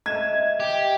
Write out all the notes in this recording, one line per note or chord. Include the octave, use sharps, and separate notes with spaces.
D#5 E5 G#6
G4